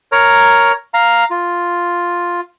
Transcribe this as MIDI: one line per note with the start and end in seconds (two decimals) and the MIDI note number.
0.12 0.72 70
0.12 0.72 73
0.12 0.72 82
0.94 1.24 77
0.94 1.24 82
1.31 2.41 65